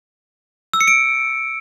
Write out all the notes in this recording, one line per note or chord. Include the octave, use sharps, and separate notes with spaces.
E6
C#7
D7